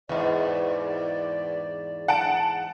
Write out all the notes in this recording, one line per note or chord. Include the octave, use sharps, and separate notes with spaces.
E2 G#2 D5
F#5 A5 D7